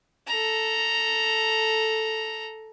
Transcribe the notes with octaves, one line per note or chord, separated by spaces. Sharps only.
A4 A#5